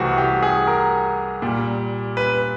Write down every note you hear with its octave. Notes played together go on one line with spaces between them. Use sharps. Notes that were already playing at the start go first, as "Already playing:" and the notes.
Already playing: C2 C3 E3 A3 F#4
G4
G#4
A#4
A#2 G3
B4